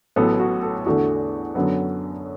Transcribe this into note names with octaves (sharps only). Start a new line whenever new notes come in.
A1 A2 F#3 B3 A4
F#4
A4
E2 D3 A3 F#4
F#2 D3 F#3 B3